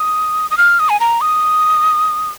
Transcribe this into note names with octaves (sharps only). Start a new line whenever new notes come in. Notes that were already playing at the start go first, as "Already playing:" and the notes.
Already playing: D#6
D#6
F6
D#6
G#5
A#5
D#6